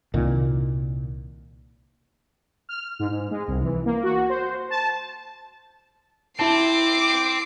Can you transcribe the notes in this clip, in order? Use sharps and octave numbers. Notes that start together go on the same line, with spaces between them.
C2 A#2 D#3
F6
G#2
G#2
G#3
C2
E3
A#3
F#4
C5
A5
C4 E4 A5 D6 C7